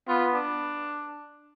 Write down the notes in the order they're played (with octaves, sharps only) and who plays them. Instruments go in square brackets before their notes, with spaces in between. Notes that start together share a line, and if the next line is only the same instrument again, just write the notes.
[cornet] B3 [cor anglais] F4
[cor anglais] D4